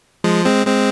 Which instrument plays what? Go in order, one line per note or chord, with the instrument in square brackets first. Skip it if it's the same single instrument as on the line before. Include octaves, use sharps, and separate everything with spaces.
[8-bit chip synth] F3 G#3
G#3 C4
G#3 C4